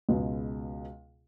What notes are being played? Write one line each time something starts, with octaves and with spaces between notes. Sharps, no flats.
C#2 B2 G#3 B3